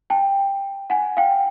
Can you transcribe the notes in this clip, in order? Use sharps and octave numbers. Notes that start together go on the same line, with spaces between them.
G5 A5
F#5 G#5
F5 G5